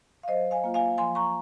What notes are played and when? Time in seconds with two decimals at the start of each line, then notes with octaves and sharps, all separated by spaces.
0.23 F5
0.28 F#3 C5 D#5
0.51 F5 G#5
0.64 A#3 F4
0.74 F5 G#5
0.98 F3 G#5 C6
1.15 A#5 C#6